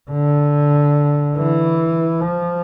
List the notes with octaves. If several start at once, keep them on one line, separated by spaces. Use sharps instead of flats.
D3
E3
F3